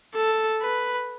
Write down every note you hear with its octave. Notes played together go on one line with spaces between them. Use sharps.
A4
B4